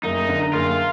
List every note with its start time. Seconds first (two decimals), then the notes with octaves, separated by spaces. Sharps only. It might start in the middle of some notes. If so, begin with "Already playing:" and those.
0.03 F#1 D#4
0.29 D3
0.53 F#1 F4